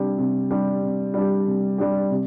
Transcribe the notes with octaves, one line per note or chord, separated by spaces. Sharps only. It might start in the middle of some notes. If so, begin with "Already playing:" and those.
Already playing: C3 G3 D4 G4
C3
G3 D4 G4
C3
G3 D4 G4
C3
G3 D4 G4
C3